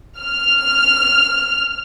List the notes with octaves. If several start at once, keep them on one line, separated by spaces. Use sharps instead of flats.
F6